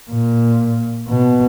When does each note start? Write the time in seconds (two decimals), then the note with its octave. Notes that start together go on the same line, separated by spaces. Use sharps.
0.11 A#2
1.09 B2